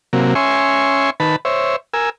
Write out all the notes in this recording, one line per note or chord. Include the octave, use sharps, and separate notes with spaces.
C3 F#3 A#3
C#4 E5 G#5 C6 C#6
D#3 B4 A5 B5
C5 C#5 E5
A#4 G#5 E6